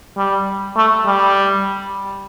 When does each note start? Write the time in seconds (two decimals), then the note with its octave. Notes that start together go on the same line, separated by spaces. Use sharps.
0.17 G3
0.76 A3
1.06 G3